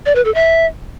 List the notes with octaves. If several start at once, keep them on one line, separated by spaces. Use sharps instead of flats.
D5
B4
A4
E5